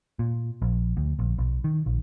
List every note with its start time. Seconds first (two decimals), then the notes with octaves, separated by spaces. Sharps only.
0.19 A#2
0.62 A#1
0.97 D2
1.19 A#1
1.38 B1
1.64 D#3
1.86 A#1